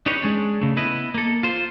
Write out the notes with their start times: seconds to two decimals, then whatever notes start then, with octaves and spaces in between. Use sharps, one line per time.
0.06 D4 D#4 G4 B4 C#5
0.22 G#3 C#4 D4
0.62 C#3 A3
0.77 B3 E4 B4 D#5
1.14 A#3 A4
1.43 F4 C5